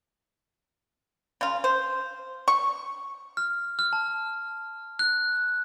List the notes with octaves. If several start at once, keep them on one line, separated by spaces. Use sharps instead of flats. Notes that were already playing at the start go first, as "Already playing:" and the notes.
C#3 F4
C5
C#6
F6
F6
A5
F#6